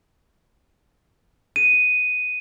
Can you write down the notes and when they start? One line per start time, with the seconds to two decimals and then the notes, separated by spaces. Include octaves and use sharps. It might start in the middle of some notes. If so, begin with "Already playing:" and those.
1.56 D#7